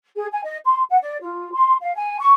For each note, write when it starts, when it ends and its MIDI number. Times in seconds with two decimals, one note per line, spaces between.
0.17 0.26 68
0.31 0.42 80
0.43 0.57 75
0.64 0.83 84
0.88 0.97 78
1.02 1.17 74
1.22 1.52 65
1.52 1.75 84
1.82 1.93 77
1.94 2.16 80
2.19 2.33 85